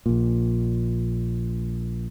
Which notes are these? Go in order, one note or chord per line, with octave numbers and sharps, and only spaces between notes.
A#1 A#2